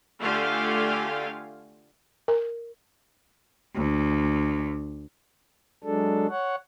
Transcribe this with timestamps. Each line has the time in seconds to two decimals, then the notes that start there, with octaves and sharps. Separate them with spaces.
0.21 D3 A3 F4 G4 F5 G#5
2.28 A#4
3.75 D2
5.84 F#3 G#3 D4 A4
6.30 C#5 F#5